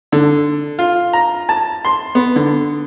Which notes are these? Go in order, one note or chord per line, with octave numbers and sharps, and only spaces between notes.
D3
F4
A#5
A5
C6
B3
D3